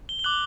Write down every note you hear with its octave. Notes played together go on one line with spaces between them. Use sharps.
G7
G7
D6 F#6 F#7